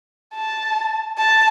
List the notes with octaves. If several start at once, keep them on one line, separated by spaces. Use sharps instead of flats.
A5
A5